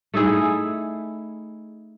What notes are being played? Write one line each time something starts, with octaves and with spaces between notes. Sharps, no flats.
A3 D#4 E4 G#4